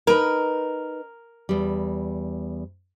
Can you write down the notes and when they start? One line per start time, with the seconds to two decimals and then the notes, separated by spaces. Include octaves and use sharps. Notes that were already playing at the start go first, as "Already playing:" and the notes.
0.07 D#4 A#4 B4
1.49 E2 G3